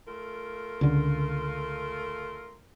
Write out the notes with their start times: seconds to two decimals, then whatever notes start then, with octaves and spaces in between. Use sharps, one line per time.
0.08 A3 F4 A#4
0.81 C#2 D3